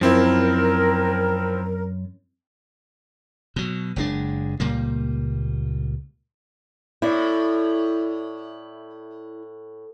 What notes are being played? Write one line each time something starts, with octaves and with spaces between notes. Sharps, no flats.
F#2 F3 C4 E4 A#4
B2 F#3
F#1 G#3 D4
C#2 A#2 G3 A#3
A2 E4 D5